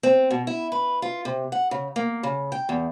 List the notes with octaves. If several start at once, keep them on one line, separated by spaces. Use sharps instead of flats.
C4
B2
E4
B4
F4
C3
F#5
C#3
A#3
C#3
G5
E2